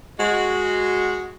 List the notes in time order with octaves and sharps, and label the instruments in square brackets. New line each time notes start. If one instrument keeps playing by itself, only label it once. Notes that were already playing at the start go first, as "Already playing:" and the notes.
[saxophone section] G#3 F#4